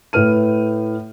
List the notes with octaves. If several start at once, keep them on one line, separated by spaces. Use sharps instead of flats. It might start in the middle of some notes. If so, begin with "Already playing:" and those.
A2 B4 F6 D#7